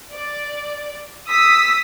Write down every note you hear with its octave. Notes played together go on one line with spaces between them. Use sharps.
D5
D#6 E6 B6